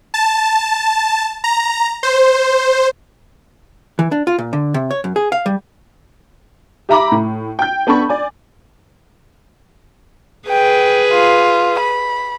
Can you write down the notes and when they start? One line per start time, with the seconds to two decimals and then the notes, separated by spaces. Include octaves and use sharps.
0.14 A5
1.44 A#5
2.03 C5
3.99 E3
4.12 D4
4.27 F4
4.39 A#2
4.53 D3
4.74 C3
4.91 C#5
5.04 F#2
5.16 G#4
5.32 F5
5.46 G3
6.89 G4 E5 A#5 B5 D6
7.12 A2
7.59 G5 G6
7.87 B3 D4 A4 B5 C#6
8.09 D5 G#5
10.49 G#4 B4 G5
11.13 F4
11.80 B5